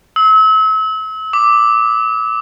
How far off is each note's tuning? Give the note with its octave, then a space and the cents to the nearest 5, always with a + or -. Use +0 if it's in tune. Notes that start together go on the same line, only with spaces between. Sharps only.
E6 -35
D6 +5